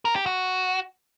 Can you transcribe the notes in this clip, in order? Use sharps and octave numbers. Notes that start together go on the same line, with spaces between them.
A#4
G4
F#4